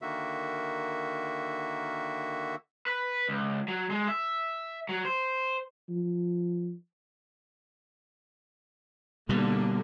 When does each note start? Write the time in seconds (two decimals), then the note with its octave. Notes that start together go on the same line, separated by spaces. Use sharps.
0.02 D3 D#3 A#3 F#4 E5
2.87 B4
3.29 C#2
3.68 F#3
3.90 G#3
4.08 E5
4.89 F#3
5.05 C5
5.89 F3
9.29 B2 D3 G3 A#3